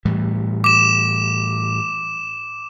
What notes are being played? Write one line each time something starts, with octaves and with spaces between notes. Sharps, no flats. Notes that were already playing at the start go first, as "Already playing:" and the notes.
A2 E3 G3
D6 E7